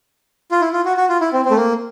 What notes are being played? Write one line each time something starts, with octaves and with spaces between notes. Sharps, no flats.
F4
E4
F4
F#4
F#4
F4
E4
C4
C4
A3
A#3